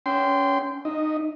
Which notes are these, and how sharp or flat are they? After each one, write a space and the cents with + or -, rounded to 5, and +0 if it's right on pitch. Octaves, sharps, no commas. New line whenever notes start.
C#4 +20 G5 +0 C6 -20
D#4 -15 D#5 +0